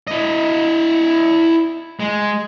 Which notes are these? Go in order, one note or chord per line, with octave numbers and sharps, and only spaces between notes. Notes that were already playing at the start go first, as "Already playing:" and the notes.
E4 D#5
G#3